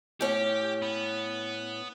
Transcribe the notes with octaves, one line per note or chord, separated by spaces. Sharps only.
A2 C#4 G4
B3